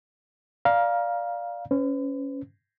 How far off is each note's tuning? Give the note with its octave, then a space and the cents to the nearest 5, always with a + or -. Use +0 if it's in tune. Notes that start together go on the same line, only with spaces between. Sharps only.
D5 +0 F5 +0 A#5 +25
C#4 +0 B4 +40